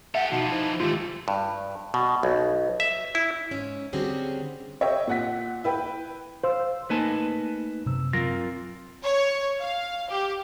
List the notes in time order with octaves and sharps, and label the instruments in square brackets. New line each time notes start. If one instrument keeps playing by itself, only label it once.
[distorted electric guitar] G4 A4 [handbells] E5 [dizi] F#5
[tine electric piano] B2 D#4 F#4 [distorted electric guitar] E3 F3 [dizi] A5
[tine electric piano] D#4 E4 C5
[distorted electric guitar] G#2 A3 [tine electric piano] D#3 G#3 G4 [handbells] F4
[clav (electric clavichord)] G2
B2
B1
E5
E4
[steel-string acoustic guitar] G#2 C#4
D3 G3 C4 C#4 F#4 G#4
[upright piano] C#5 D#5 E5 G5
A#2 F#5 B6
E4 B4 G5 B5
[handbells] C5 [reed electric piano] F5 C6 E6
[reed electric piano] A3 A#3 D#4 [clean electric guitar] B4 G#5 A5
[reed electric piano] F#2 E6 [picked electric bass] C3
[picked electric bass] F#3 C4 [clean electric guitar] F4 A#4 [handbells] A#6
[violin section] C#5
F5
G4